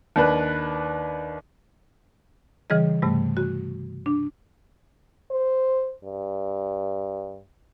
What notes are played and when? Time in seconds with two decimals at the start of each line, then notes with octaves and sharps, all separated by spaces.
0.16 D#2 D4 B4
2.70 C#3 E3 G3 G#4 D#5
3.02 G2 C3 G3 A3
3.37 F#4
4.06 D4
5.31 C5
6.04 G2